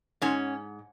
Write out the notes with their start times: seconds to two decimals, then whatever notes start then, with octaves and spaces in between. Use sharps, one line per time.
0.21 G#2 C#4